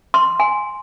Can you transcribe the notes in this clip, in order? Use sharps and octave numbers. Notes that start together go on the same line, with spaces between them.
C6
G#5